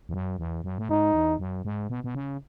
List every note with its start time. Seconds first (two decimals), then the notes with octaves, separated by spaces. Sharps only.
0.09 E2
0.14 F#2
0.39 E2
0.64 F#2
0.78 A2
0.89 G#2 D#4
1.14 E2
1.39 F#2
1.65 G#2
1.90 B2
2.04 B2
2.15 C#3